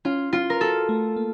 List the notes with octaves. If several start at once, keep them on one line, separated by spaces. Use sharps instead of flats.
C#4 F4
C#4 F4
A#4
F#4 A4
A3
A#3